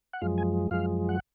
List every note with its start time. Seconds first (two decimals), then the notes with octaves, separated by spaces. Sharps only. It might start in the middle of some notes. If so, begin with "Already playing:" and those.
0.13 F#5
0.22 F#2 F3 G#3 F5
0.38 G#5
0.71 F#2 F3 G#3 F5
1.09 F#5